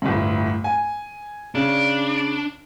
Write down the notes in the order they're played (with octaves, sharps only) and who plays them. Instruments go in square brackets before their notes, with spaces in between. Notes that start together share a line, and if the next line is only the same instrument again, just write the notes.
[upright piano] G1 D2 A2
G#5
[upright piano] C#3 [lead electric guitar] D4